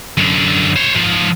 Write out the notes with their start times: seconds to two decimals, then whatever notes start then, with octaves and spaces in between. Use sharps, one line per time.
0.18 F#2 D3
0.76 C5 C#5
0.95 G#2 F3